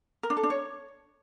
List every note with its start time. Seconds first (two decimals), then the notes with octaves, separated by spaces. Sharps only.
0.23 A#4
0.30 D4
0.37 A4
0.43 D4
0.50 C#5